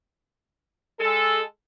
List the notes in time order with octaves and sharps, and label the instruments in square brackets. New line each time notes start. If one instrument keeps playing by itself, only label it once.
[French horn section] G#3 A4